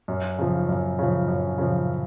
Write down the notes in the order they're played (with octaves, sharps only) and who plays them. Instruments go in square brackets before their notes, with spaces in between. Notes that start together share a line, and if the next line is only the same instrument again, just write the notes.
[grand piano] F#2
C#3 F3
F#2
C#3 F3
F#2
C#3 F3